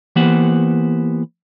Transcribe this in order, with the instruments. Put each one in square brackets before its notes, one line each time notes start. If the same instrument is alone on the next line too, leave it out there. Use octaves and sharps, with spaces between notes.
[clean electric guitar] E3 A#3 B3 G4 C5 F#5